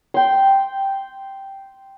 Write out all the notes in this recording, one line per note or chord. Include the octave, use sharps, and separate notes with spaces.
G5 C6